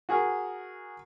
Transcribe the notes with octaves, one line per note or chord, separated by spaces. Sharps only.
F#4 G#4 A#4